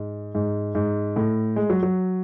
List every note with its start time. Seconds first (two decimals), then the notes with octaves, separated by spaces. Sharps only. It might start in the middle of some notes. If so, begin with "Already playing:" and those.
Already playing: G#2
0.35 G#2
0.75 G#2
1.16 A2
1.56 G#3
1.70 F#3
1.83 F#3